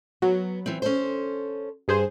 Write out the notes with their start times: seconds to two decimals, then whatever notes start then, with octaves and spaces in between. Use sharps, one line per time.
0.22 F#3 B3
0.66 E3 C4
0.82 C#4 A4 C5
1.88 G2 G#4 C5